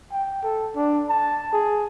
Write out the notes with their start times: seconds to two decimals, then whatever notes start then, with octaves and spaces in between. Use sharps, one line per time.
0.12 G5
0.43 A4
0.75 D4
1.09 A5
1.53 G#4